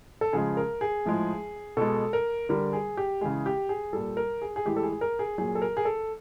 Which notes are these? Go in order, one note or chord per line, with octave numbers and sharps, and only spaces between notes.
A4
C#3 F3 G#3 G#4
A#4
G#4
A2 F3 G#3
B2 G#3 A4
A#4
D3 G3 A#4
G#4
G4
C#3 E3 G#3 G#4
G4
G#4
A#2 G3 A4
A#4
G#4
G#4
A2 E3 G#3 G4
A4
G#4
A#4
G#4
A#2 F#3 G#4
A4
A#4
G#4
A4